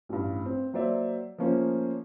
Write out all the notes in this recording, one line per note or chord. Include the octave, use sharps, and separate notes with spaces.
A1 G2
C4
F#3 A#3 C5 D5 E5
F3 A3 A#3 C#4 C5